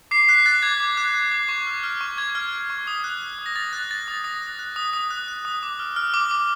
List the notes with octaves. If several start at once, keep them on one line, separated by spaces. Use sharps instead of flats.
D6 C7
F#6 B6
F#6 A6
D6 G#6
D6
F#6
F#6
D6
C#6
F6
F6
C#6
C#6 G#6
F6
F6
C#6
D#6
F#6
F#6
D#6
A#6
D#6 A6
F#6
F#6 A6
D#6
D#6 A#6
F#6
F#6
D#6
D#6
F#6
F#6
D#6
D6
F6
F6
D6
D6